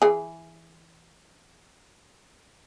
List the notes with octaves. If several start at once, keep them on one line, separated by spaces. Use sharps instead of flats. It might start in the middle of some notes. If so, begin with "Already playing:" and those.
E3 G#4